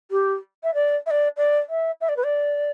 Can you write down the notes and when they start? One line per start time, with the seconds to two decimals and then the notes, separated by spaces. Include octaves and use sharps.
0.11 G4
0.63 E5
0.74 D5
1.06 E5
1.10 D5
1.37 D5
1.69 E5
2.01 E5
2.09 D5
2.17 B4
2.24 D5